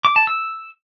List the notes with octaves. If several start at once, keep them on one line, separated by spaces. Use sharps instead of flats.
D6
A5
E6